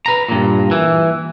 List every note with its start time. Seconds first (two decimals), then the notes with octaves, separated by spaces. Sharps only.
0.06 B4 A#5
0.29 G2 A#2
0.71 E3